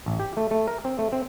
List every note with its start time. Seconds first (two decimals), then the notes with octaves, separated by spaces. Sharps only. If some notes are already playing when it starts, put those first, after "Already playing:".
0.06 A1
0.19 G4
0.37 A3
0.51 A3
0.68 A#4
0.85 C4
0.99 A3
1.12 C4